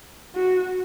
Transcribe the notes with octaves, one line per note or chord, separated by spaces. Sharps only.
F#4